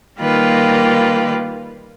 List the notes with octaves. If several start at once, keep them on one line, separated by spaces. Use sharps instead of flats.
D#3 G3 A#3 F4 G4 B4